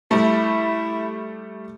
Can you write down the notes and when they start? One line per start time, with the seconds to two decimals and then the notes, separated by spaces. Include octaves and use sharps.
0.11 G3 A3 E4